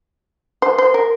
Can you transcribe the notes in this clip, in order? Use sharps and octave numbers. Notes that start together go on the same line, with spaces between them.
C5
C5
A#4